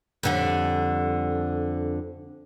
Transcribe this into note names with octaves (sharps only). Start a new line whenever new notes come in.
F2 D3 G3